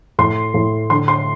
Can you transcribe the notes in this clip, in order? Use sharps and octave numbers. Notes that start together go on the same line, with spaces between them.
A2 C6
A2
D3 C6
C6